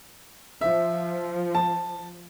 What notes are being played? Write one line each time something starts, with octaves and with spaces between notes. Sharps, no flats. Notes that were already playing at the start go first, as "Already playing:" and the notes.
F3 E5
A5